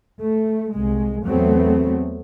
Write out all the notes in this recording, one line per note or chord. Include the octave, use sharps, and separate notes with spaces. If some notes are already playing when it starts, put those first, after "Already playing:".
A3
C2 G#3
E2 F#3 A3 B3 C4